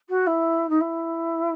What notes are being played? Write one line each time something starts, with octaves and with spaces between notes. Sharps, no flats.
F#4
E4
D#4
E4